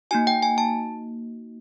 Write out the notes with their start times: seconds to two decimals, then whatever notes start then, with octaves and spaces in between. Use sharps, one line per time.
0.11 A#3 D#4 F#4 G#5
0.27 G5
0.43 G#5
0.58 A5